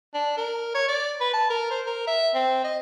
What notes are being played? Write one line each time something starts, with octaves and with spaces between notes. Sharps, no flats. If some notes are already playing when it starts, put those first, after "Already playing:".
D4
A#4
C#5
D5
B4
A5
A#4
C5
A#4
E5
C4
D#5